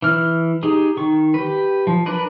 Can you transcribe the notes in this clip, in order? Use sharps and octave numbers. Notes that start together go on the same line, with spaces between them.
E3 F6
D#4 G4 G#4
D#3 C#6
G4 B4
F3
D4 A#4 B4 D5